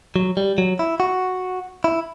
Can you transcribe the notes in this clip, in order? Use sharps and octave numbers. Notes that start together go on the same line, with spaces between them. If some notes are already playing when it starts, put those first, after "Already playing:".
F#3
G3
F#3
E4
F#4
E4